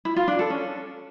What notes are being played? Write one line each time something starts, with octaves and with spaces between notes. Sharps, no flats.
E4
F4
D4
A4
C#4